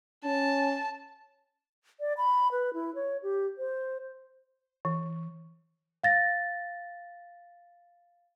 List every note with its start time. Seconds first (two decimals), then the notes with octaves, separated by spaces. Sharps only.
0.25 C#4 A5
2.00 D5
2.17 B5
2.52 B4
2.74 E4
2.95 C#5
3.23 G4
3.58 C5
4.85 E3
6.03 F5 A6 A#6